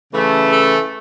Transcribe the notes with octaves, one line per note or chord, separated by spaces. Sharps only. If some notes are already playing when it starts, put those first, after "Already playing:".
C#3 E3 A3
A4